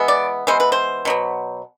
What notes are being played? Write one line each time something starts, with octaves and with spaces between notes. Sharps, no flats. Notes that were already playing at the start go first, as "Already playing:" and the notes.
Already playing: E3 G#3 B3
D5
E3 G#3 B3 C5
B4
C5
B2 F#3 B3